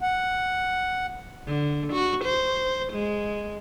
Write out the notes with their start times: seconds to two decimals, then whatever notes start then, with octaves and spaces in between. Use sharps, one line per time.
0.01 F#5
1.47 D3
1.93 F#4
2.24 C5
2.93 G#3